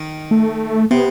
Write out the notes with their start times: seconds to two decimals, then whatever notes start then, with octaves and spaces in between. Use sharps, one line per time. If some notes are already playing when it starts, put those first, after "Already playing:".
Already playing: D#3
0.31 A3
0.91 C3 B3